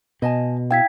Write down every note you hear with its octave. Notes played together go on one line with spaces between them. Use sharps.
B2 D#5 G#5 A5
E4 F5 G5 G#6 B6